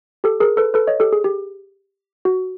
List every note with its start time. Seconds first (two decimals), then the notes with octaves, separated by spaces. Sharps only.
0.24 G4 A4
0.40 G#4 A#4
0.57 A4 B4
0.74 A4 B4
0.87 C#5 D#5
1.00 G4 A4
1.13 G#4
1.24 G4
2.25 F#4